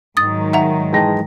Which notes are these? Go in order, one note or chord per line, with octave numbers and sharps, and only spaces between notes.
G#2 D#3 F#3 D#6 A6
E5 F#5 A#5
E3 G#3 D#4 G5 A5 A#6